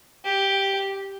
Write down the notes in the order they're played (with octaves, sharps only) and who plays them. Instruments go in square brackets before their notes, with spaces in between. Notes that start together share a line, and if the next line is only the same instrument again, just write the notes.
[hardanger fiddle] G4